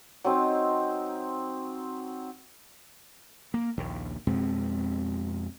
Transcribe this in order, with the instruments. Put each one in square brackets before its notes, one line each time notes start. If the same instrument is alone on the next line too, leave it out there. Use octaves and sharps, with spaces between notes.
[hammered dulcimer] F#3 C4 D#4
[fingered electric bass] A#3
A#1 D#2
F2 B2 G#3 C4